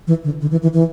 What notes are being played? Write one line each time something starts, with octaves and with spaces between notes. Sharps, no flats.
E3
D3
D3
E3
E3
E3